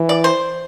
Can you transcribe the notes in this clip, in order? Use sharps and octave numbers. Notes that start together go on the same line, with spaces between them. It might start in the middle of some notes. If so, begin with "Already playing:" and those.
Already playing: E3
D5
C5